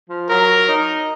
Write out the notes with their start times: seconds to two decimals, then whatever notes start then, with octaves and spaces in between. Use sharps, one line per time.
0.09 F3
0.30 F#3 A#4
0.69 D#4